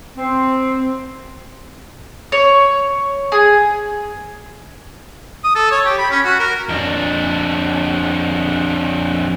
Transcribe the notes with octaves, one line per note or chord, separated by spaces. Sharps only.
C4
C#5
G#4
D#6
A4
C#5
G4
B5
C#4
F#4
A#4
F2 D4